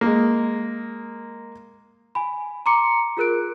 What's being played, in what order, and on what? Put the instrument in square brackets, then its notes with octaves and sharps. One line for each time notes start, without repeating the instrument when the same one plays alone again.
[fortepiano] G#3 A#3
[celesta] G#5 B5
A#5 C6 D6 C#7
F4 G#4 A#4 F#6 D7